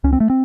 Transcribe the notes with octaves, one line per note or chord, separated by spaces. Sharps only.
C#2 C#4
C4
A3
C4